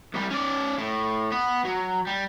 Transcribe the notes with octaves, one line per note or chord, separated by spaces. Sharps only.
C2 G3
C#4 D5
A2
B3
F#3
G3